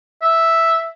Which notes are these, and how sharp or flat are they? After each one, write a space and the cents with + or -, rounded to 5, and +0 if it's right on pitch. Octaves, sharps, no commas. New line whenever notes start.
E5 -5